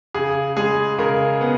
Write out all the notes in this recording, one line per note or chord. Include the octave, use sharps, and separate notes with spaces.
C#3 G#4
G#3 G#4
C#3 A#4
B3